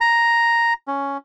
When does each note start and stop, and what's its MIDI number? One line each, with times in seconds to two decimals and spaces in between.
0.01 0.73 82
0.88 1.17 61